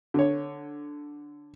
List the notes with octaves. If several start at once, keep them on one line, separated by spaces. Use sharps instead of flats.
D3 C#5